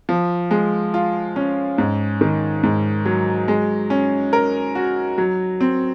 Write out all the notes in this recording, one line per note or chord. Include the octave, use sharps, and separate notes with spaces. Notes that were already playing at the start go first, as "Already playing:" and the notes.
F3
G#3
F4
C#4
G#2
D#3
G#2
F#3
G#3
C#4
A#4
F#4
F#3
C4